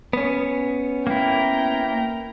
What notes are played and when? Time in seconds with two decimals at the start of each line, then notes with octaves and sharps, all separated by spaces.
0.13 B3 C#4
1.07 A#3 E4 G5 A#5